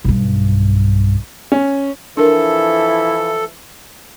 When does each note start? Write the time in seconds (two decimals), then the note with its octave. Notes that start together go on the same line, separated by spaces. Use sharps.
0.05 B1 G2
1.52 C#4
2.17 E3 F3 D4 E4 A4 A#4